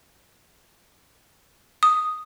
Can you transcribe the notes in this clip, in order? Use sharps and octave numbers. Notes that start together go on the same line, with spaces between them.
D#6